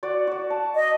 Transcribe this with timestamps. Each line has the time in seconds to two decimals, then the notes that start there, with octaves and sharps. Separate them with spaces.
0.03 F#4 D5
0.27 F#4 D5
0.50 A5
0.75 D#5